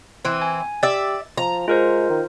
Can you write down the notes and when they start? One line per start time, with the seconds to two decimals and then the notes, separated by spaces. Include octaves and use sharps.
0.25 E3 C4
0.42 G#5
0.83 G4 D5 E5 A6
1.37 F3 A#5
1.68 G#3 F4 A#4 C5
2.10 D#3